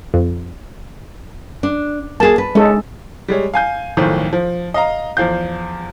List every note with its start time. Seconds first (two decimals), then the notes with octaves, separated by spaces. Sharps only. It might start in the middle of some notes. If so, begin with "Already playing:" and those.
0.14 F2
1.63 D4
2.20 A#3 G#4 A5
2.38 B4
2.55 G#3 C#4 A4
3.28 G3 G#3 C#5
3.54 F5 G#5 G6
3.97 B1 A2 D#3 F3
4.33 F3
4.74 D#5 F5 A#5
5.17 E2 F3 F5 G6